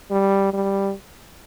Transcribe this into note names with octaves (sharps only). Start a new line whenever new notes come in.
G3
G3